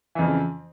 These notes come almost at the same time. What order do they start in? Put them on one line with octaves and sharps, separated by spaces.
E3 F2 C#3